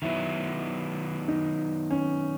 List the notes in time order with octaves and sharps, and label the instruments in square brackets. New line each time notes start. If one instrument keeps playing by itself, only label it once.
[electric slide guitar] D#3 F#3 B3 [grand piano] E4
[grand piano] D#4
C#4